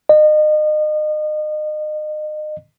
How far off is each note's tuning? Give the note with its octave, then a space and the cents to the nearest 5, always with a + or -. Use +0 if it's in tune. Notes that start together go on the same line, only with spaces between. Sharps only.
D#5 -35